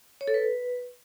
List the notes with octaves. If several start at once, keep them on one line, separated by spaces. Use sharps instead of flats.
C#5
A4
B4